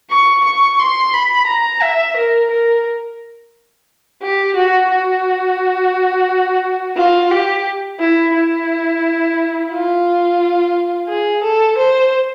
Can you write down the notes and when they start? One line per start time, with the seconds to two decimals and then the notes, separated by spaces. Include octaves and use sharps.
0.10 C#6
0.44 C#6
0.79 C6
1.13 B5
1.46 A#5
1.81 E5
2.16 A#4
2.50 A#4
4.22 G4
4.56 F#4
4.91 F#4
6.96 F4
7.31 G4
7.99 E4
8.34 E4
9.71 F4
11.08 G#4
11.43 A4
11.77 C5